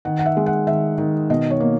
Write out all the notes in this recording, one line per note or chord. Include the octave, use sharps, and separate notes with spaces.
D#3 F#5
F#5
E5
G#3
F#5
D#3 E5
D#3
B2 D#5
C#5
A#3